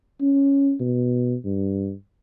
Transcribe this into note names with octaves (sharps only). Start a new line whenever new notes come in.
C#4
B2
G2